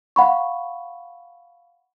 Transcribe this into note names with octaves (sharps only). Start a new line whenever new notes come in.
F5 F#5 B5 C#6